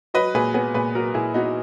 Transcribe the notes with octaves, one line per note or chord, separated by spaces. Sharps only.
F#3 B4 D#5
A#2 G#4 B4
B3 G#4 B4
A#2 G#4 B4
F#3 F#4 A#4
A#2 E4 G#4
B3 D#4 F#4